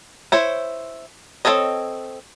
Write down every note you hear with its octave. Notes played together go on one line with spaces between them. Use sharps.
E4 C5 C#5
C4 D#4 A4 C#5 D#5